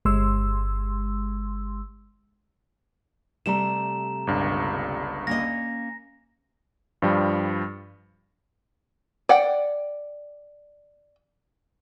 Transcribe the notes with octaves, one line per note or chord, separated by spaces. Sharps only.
G1 G#3 C6 E6
C3 G3 A3 A#5 E7
G1 C#2 G2
A#3 C#4 D#5 A#6
G2 F3 G3
D5 F#5 G5